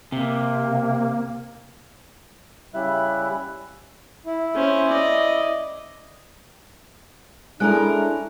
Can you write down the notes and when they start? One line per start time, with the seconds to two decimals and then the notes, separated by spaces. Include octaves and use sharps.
0.12 C3 A#3
2.74 C#3 G3 E4 E5 F#6
4.26 E4
4.55 C#4 C5
4.88 D5 D#5
7.60 G#3 C#4 D4 E4 A4 A#4 G#5 F#6